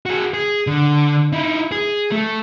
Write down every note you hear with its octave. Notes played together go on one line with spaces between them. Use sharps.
F#4 G#4
G#4
D3
D#4 E4
G#4
A3